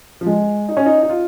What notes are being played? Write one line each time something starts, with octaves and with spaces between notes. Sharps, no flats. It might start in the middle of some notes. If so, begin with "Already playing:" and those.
F3
G#3
D#4
C#4
D#4
D#4
F4